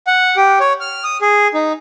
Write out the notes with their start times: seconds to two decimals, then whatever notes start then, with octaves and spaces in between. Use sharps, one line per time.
0.07 F#5
0.37 G4
0.60 C#5
0.80 F6
1.04 D#6
1.21 G#4
1.54 D#4